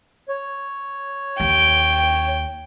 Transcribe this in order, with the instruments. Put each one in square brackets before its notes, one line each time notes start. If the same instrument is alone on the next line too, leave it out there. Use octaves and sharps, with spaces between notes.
[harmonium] C#5
[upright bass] D#2 [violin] G5